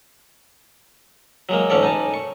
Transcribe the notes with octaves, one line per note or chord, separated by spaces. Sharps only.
F#3 G#3 A#3
D2 G#2 C#4 A4 C#5 D5
D#4 G#5 A5
C#6